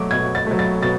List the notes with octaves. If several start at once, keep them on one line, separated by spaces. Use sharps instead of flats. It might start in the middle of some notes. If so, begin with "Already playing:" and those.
Already playing: B2 F#3 A3 D6
B2 G#6
A6
F#3 A3
A6
B2 A6